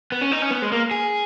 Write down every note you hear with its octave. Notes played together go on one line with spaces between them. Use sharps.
B3
C#4
D#4
C#4
B3
G#3
A#3
G#4